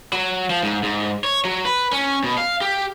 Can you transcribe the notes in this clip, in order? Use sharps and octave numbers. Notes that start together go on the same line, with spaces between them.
F#3
F3
G#2
G#2
C#5
F#3
B4
C#4
B2
F5
G4